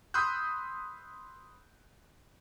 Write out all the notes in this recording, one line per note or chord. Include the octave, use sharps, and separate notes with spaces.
B5 C6 D#6 E6 F#6 G6